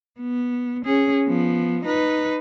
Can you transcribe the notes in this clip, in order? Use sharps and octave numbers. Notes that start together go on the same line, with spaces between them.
B3
C#4 G#4
F3 B3
D#4 B4